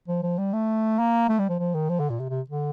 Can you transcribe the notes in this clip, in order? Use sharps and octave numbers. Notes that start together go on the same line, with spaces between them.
F3
F3
G3
A3
A#3
A3
G3
F3
F3
D#3
F3
D3
A#2
C3
C3
D3